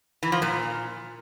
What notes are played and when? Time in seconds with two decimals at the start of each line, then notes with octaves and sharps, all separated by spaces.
0.23 E3
0.32 F3
0.42 A#2